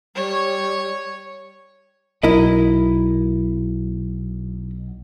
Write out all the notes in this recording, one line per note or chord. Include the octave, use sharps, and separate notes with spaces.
G3 C#5
B1 E4 A#4 D#5